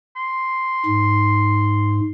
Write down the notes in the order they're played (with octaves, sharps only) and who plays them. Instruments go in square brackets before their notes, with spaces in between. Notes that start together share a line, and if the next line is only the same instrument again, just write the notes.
[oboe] C6
[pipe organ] G#2